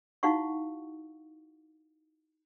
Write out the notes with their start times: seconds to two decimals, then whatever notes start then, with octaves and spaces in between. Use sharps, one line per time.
0.23 D#4 E4 F#4 F5 F#5 C#6